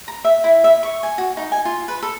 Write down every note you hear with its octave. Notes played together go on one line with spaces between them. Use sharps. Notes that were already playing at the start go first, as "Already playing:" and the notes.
A#5
E5
E4
E5
C#6
G#5
F#4
D#4
G#5
F4
B4
A4